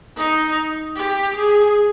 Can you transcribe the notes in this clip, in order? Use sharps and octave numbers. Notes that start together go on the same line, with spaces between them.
D#4
G4
G#4